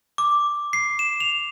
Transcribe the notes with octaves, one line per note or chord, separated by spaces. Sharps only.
D6
C7
E7
F7